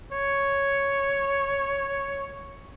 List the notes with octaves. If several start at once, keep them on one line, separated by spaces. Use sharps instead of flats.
C#5